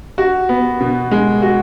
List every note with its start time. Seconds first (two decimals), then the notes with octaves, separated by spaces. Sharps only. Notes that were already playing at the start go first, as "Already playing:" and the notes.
0.18 F#4
0.49 B3
0.80 B2
1.11 G#3
1.42 F#4